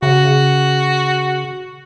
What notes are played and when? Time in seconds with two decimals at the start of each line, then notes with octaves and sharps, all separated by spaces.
0.03 C#3 F#4